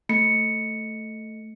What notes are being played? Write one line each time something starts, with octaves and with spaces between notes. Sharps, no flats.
A3 C#7